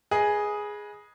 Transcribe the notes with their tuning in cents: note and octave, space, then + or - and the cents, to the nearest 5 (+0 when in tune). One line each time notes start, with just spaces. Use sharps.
G#4 +0 B4 -30 D#5 +0